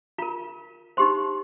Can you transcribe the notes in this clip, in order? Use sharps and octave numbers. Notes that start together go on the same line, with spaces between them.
F4 A#4 A#5
D#4 G4 C5 C6